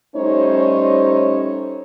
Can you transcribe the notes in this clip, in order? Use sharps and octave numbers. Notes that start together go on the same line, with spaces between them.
G3 A3 C#4 D#4 C5 C#5